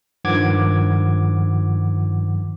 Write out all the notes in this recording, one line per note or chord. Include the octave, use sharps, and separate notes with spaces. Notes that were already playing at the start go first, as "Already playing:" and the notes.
G2 D#3 F3 F#5 D6 G#6